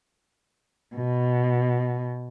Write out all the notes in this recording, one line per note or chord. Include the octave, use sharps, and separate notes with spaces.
B2